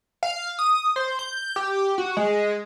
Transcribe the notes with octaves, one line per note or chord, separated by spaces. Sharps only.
F5
D#6
C5
G6
G4
F#4
G#3